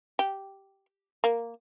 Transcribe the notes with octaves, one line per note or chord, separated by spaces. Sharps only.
G4
A#3